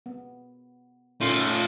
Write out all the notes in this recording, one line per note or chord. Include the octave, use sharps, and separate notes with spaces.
B3
A#2 A3 C#4 D#4 F4